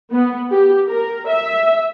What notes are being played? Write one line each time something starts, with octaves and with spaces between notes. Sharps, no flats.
B3
G4
A#4
E5